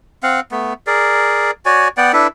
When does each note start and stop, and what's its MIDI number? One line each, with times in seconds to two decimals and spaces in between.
0.23 0.40 60
0.23 0.40 77
0.23 0.40 78
0.51 0.73 57
0.51 0.73 59
0.87 1.51 68
0.87 1.51 70
0.87 1.51 74
1.65 1.88 66
1.65 1.88 73
1.65 1.88 74
1.65 1.88 80
1.97 2.12 59
1.97 2.12 74
1.97 2.12 78
1.97 2.12 79
2.13 2.27 62
2.13 2.27 64
2.13 2.27 69
2.13 2.27 71